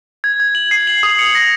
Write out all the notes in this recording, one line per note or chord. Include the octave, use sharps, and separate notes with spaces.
G#6
G#6
F#7
C7
F#7
D#6
C#7
A#6